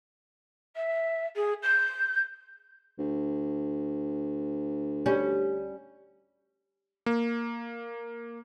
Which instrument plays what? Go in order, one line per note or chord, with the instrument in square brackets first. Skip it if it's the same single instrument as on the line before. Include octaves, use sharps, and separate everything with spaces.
[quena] E5
G#4
G6
[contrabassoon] D2
[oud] G3 C#4
[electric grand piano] A#3